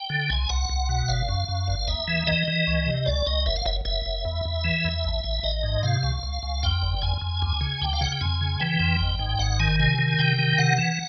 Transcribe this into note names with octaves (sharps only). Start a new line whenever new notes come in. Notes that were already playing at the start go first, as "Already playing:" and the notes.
Already playing: G5
D3
C2 G#5
C2 F#5
C2
B2
G1 F5
F#2
F#2
G1
D#2 E5
E3
E3 D#5
E3
C#2
C3
C#2 D5
C#2 D#5
F#1 E5
F5
F#1 E5
F#1 E5
F#1
E2
E2
E3
E2
A1
A1
A1 D#5
G#2
C3 F5
C#2
C#2
C#2
F2 G5
G1
F2 G#5
F2
D2
C#3
D2 G5
F5
C#3 F#5
G5
F2 G#5
C#3
E3 G5
F2
G#1
G#2
G#1 F#5
D#3 G#5
C3 G#5
D#3
C3 G5
D#3
C3 F#5
E3